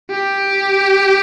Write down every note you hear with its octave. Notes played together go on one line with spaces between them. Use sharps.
G4